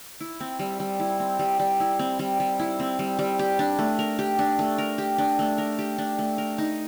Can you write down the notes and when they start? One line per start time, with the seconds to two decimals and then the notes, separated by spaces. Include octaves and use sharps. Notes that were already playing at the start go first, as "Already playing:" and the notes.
0.20 E4
0.40 C4
0.59 G3
0.80 G3
1.00 E4
1.20 C4
1.39 G3
1.59 G3
1.80 E4
1.99 C4
2.19 G3
2.40 G3
2.59 E4
2.80 C4
2.99 G3
3.19 G3
3.39 G4
3.59 D4
3.79 A3
3.99 A#4
4.19 G4
4.39 D4
4.59 A3
4.78 A#4
4.98 G4
5.18 D4
5.39 A3
5.58 A#4
5.79 G4
5.98 D4
6.19 A3
6.38 A#4
6.58 D#4